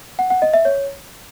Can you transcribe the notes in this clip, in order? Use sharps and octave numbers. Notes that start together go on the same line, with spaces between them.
F#5
F#5
D#5
E5
C#5